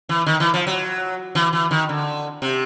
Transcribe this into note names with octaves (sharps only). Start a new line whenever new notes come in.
E3
D#3
E3
F3
F#3
E3
E3
D#3
D3
C3